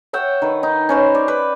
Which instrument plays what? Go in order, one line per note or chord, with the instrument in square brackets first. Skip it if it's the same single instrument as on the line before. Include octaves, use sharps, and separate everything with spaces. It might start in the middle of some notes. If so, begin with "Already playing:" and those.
[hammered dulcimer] C#5 E5 F#5 G5
D#3 B4
D#4
C#4 B4 C5
D5
B4